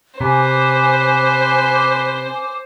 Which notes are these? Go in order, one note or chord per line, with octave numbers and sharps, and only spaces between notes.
C3 B4 C5 G#5 D6